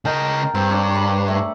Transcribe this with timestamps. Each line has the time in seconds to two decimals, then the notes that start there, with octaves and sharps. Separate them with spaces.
0.05 C#3 A#4 D#5 G5 A5
0.54 G2 C4
0.69 G3 D4 C#5
0.95 B5
1.28 A3